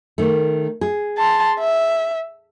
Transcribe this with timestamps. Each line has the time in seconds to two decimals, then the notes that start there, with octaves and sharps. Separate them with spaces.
0.18 D#3 A3
0.81 G#4
1.18 A5 C6
1.59 E5